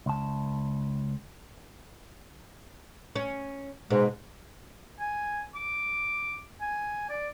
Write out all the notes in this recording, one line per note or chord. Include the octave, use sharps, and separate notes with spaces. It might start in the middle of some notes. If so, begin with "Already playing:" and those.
C#2 A5
C#4
G#2 B2 G#3
G#5
D6
G#5
D5